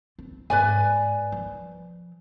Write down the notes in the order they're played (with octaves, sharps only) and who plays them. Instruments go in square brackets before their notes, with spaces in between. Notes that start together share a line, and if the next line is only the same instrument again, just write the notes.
[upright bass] C4
[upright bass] G#2 [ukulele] B4 D5 G#5
[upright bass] F3